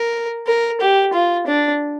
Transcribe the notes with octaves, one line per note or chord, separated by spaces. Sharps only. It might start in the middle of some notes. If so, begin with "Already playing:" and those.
Already playing: A#4
A#4
G4
F4
D4